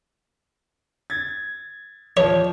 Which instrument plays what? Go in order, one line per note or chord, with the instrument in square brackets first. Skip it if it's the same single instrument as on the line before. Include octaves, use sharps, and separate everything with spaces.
[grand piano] G#6 A6
[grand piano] F3 G3 [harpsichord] C#5